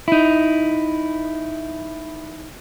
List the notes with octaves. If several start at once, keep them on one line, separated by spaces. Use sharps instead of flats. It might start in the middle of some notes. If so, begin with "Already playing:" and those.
D#4 E4